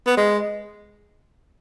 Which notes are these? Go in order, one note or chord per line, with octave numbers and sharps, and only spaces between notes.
B3
G#3